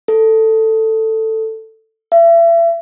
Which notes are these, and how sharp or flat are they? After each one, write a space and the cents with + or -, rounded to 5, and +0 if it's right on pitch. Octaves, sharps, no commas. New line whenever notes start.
A4 +10
E5 +35